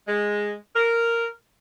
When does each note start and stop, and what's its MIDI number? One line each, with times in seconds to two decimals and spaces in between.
0.08 0.53 56
0.75 1.27 70